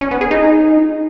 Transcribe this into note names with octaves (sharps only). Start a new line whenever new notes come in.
C#4
B3
G#4
D#4